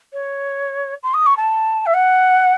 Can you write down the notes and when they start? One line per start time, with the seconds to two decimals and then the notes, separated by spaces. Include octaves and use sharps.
0.13 C#5
1.03 C6
1.14 D#6
1.26 C#6
1.37 A5
1.86 E5
1.94 F#5